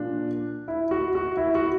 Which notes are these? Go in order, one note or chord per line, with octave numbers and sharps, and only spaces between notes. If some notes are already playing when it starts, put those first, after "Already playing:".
Already playing: A#2 F3 D4
E4
F#4
F#4
E4
F#4